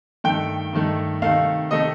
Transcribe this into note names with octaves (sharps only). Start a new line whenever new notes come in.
G2 D#3 A3 G5
G2 D#3 A3
C3 D#3 A3 F5
C3 D#3 A3 D#5